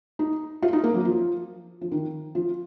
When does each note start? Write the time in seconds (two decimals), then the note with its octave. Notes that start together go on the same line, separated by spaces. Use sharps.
0.19 D#4
0.62 F4
0.73 D#4
0.84 A#3
0.94 F#3
1.05 F3
1.81 F3
1.92 D#3
2.35 F3